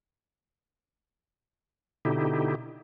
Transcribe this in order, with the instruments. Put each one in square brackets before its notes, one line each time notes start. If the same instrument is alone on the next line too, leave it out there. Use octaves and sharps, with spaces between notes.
[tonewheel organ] B2 D3 D#4 E4 G4